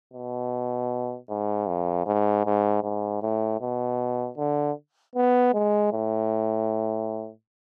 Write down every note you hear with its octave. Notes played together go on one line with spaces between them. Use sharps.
B2
G#2
F2
G#2
G#2
G#2
A2
B2
D3
B3
G#3
A2